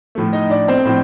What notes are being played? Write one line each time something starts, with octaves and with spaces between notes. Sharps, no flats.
A2 F3 A3
D#4 D#5
D4 D5
C4 C5
A2 F3